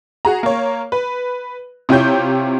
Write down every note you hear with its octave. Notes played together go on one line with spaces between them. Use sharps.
F#4 G#4 A#5
A#3 C#5
B4
C3 E4 F4 G4 C#5 G6